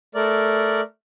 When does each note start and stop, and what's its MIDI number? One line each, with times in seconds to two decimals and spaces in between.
0.15 0.81 57
0.15 0.81 70
0.15 0.81 74